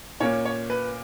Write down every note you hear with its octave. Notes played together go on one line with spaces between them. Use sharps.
A#2 A#3 C#4 C#5
C#5
B4